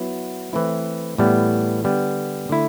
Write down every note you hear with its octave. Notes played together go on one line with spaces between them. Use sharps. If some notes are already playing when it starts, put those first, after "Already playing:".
Already playing: F#3 B3 E4
E3 A3 C4 E4
A2 E3 G3 B3
D3 G3 B3
D3 A3 E4